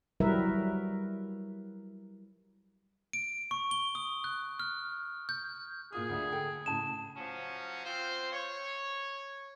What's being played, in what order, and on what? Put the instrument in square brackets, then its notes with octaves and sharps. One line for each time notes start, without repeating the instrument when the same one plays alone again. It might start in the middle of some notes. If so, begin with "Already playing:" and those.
[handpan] F#3 G3 E4 A#4 B4 E5
[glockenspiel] D7
C#6
G7
D#6
F#6
F6
G6
[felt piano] A#2 F4 D#6 [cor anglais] G#4
[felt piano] D2 D3 E5
A4 G5
[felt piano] A2 C#3 [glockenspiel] A5 E7
[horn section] F3 F#3 C#4
C4 F4 C5
C#5